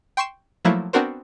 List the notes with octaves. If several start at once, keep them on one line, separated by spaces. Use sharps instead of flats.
G5 C6 C#6 C7 E7
F3 F#3 A3 A#3 E4
B3 C4 D4 F#4 A#4 C5